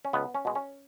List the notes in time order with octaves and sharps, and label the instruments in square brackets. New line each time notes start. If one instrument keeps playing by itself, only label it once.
[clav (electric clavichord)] C#4
C#2 B3
C#4
B2 G#3
C#4